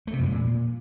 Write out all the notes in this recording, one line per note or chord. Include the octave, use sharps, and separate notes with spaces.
A3
C3
F2
G#3
A#2